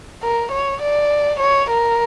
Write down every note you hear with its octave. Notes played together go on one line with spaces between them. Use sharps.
A#4
C#5
D5
C#5
A#4